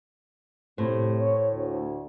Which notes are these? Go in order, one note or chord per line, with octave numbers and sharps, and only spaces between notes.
A2 C3 C5
C#5
D2